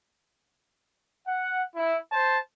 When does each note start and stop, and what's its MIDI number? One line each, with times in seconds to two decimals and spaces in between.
1.27 1.61 78
1.74 1.96 64
2.11 2.37 72
2.11 2.37 81